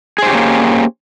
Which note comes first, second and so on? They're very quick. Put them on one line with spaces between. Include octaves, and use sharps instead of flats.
G#4 C5 G4 C#4 A#3